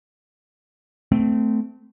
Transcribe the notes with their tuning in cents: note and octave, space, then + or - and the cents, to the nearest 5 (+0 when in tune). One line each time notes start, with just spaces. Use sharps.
A3 +0 C4 -25